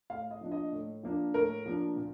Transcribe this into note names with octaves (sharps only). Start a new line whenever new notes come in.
A2 F5
D#5
F3 A#3 D4
D#5
A2
F3 A#3 D4
A2 A#4
F3 A#3 D4
A#2